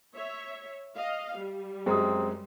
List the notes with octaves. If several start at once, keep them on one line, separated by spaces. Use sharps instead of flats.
C#5 E5
D#5 F5
G3
F#2 G#3 C4 G#4 A#5 D#6